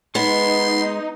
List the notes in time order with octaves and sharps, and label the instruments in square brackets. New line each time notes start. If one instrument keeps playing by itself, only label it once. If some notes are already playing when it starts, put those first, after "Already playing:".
[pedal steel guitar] G#3 [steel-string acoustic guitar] B3 [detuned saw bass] D#4 [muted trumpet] C6